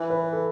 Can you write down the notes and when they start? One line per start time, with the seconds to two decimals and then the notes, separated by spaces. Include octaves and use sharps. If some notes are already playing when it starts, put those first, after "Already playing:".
Already playing: E3 B4
0.10 B4
0.33 A4